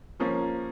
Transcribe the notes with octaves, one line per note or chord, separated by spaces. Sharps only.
F3 A#3 C#4